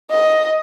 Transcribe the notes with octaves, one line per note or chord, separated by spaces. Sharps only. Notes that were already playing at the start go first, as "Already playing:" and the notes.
D#5